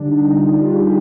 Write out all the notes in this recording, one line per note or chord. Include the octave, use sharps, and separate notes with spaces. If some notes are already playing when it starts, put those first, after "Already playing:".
Already playing: D3 G3 D4
D#4
D3 G3 F4
D4
G4
G#4